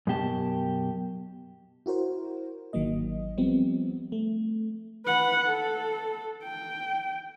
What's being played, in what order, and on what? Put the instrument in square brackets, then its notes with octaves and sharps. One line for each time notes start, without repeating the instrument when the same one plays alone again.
[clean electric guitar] F#2 B2 G4 A5
[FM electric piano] E4 F#4 A#4 C5
G#1 D#3 F#3 A#3 D#5
F3 G3 B3 C4
A3
[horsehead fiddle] B4 F#5
A4
G5